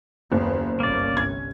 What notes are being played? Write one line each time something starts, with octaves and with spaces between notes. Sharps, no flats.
F#1 D#2 C#3 B3
G1 C2 A#3 C#4 D5
G#6